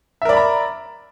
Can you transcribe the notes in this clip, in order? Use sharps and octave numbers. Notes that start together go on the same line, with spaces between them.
A#4 D5 E5 A#5 B5